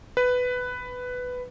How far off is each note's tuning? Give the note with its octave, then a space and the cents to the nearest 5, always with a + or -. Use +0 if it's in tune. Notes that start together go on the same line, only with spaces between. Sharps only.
B4 +10